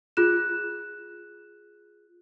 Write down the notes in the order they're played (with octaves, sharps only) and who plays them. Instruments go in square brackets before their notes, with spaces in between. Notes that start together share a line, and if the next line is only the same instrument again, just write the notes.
[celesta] F4 G#4 F#6 E7